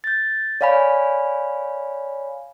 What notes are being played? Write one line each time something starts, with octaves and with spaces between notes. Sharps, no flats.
G6 A6
C#5 D5 F5 G#5 B5